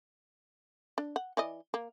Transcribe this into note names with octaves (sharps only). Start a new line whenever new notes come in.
D4
F#5
E3 D5 D#5
A#3